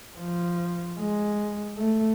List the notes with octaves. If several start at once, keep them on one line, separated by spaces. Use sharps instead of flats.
F3
G#3
A3